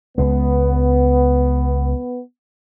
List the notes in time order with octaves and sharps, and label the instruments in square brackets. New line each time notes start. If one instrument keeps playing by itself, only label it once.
[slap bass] C#2 G#3 [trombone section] B3